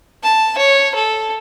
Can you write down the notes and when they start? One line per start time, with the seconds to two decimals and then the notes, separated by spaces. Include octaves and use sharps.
0.23 A5
0.58 C#5
0.95 A4